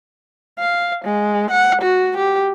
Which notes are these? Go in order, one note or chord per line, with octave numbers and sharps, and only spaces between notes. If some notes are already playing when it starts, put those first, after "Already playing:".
F5
G#3
F#5
F#4
G4